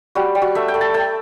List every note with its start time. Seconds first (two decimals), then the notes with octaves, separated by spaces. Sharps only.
0.15 G3 F#4
0.35 G3
0.42 F#4
0.55 A3 E5
0.68 G5
0.74 A3
0.81 A5
0.94 A3 G5